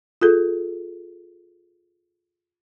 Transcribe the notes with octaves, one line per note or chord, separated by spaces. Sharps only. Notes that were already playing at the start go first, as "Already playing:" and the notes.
F4 G#4 A4